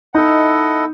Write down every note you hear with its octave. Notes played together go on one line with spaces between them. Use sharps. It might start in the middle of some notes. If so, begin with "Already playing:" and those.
D#4 E4 A4 D#5 F#5